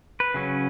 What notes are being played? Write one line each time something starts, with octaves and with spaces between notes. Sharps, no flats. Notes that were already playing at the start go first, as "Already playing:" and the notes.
B4
C#3 F#3 C#4